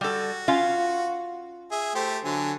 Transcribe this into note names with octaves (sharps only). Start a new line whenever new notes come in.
G3 F#4 A4
C#4 F4 F5
G#4 E5
A3 G4 C5
D3 F#3 G#5